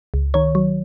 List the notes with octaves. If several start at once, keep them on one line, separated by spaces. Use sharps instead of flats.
C#2
D#3 C#5
F#3